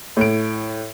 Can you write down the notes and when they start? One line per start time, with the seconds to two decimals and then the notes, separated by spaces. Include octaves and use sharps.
0.17 A2 D7